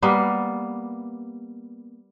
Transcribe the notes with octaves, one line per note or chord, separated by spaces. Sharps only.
G3 A#3 B3